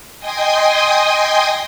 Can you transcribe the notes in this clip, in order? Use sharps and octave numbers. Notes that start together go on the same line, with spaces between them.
D#5 G5 G#5 C6 D#6